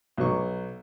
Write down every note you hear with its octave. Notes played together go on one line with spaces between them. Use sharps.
B1 F#3 C#6